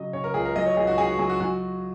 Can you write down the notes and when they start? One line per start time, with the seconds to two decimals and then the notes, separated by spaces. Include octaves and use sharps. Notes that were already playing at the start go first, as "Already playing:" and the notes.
Already playing: C#3 F#3 D#5
0.13 C#3 C#5
0.24 A#4
0.34 C#2 G#4
0.45 A#4
0.56 F#3 D#5
0.66 C#5
0.77 C#2 G#4
0.87 F#4
0.98 C#3 G#4
1.09 F#4
1.19 F#3 G#4
1.29 F#4
1.40 F#3 F#4